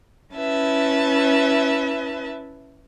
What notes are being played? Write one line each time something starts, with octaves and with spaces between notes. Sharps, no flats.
C#4 E4 B4 E5 A5